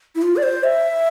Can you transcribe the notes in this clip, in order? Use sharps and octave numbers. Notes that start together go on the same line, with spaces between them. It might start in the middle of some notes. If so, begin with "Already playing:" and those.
E4
F4
D5
C5
E5